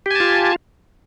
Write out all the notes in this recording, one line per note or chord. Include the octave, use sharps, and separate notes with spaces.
F4 G4 G#5 A5